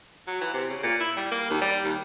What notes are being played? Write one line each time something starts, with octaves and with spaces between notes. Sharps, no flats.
F#3
E3
C3
C#3
A#2
E4
G3
A#3
D#2
G3
D#2